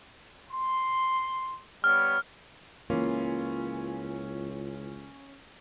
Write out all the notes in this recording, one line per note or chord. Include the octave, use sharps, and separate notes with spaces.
C6
G3 B3 C#5 F6
C#2 E3 A#3 C#4 F4